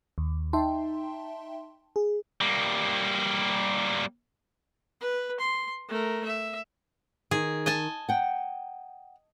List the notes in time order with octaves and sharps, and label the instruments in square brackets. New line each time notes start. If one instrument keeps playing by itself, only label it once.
[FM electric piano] D#2
D#4 E5 G5 A5 C6
G#4
[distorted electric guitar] G3 A#3
[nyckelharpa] B4
C6
A3 A#4
E5
[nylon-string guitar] D#3 [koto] G#4
[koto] D#5 G#5 A5
[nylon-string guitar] F#5 G5